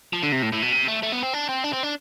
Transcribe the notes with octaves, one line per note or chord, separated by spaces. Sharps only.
F3
D3
C3
A2
A2
B2
C3
A3
A3
B3
C4
D4
C4
D4
C4
D4